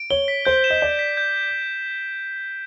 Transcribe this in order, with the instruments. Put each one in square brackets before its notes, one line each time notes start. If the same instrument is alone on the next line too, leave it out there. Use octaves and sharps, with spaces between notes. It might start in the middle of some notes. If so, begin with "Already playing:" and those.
Already playing: [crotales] D7
[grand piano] C#5 [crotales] G7
[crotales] B6
[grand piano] C5 [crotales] G6
[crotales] E7
[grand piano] D#5
[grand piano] D5 [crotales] G7
[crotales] B6
G6